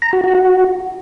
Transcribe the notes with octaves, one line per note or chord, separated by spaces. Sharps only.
A#5
F#4
F#4
F#4